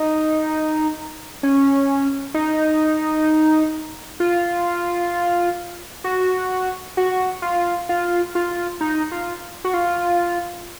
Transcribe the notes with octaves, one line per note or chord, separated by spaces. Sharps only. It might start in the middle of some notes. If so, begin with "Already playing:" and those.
Already playing: D#4
C#4
D#4
F4
F#4
F#4
F4
F4
F4
D#4
F4
F#4
F4